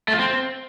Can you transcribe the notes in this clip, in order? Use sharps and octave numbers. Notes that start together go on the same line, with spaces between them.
A3
F4
C4